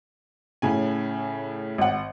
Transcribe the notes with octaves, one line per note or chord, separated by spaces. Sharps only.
A2 C#3 G#5
G#1 F#5